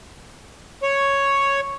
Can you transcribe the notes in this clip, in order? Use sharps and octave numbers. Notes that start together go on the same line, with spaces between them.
C#5